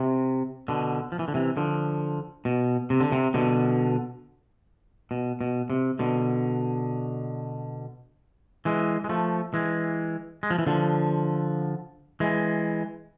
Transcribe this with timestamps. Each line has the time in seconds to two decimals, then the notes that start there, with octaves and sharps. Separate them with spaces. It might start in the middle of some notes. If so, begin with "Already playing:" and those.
Already playing: C3
0.68 B2 D3
1.12 F3
1.19 E3
1.28 D3
1.34 C3 E3
1.57 D3 F3
2.45 B2
2.90 C3
3.00 D3
3.12 C3
3.34 B2 D3
5.11 B2
5.41 B2
5.70 C3
5.99 B2 D3
8.65 E3 G#3
9.04 G#3
9.09 F3 A3
9.54 E3 G#3
10.43 G#3
10.50 F3
10.59 E3
10.67 D3 F3
12.20 E3 G#3